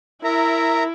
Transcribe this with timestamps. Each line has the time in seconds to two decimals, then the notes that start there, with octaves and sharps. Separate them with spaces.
0.24 E4 A#4 E5 A#5